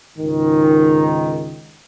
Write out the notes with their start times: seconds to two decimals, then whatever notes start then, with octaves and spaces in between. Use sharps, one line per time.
0.18 C#2 G#2 D#3